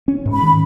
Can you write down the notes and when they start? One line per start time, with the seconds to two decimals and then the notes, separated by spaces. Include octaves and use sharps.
0.08 C#4
0.26 G#2
0.34 B5
0.42 D#3